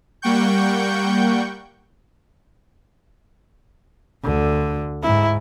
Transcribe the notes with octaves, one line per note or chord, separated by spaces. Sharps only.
G3 A#3 F#5 G5 C#6 G6
D2 D3
G#2 E4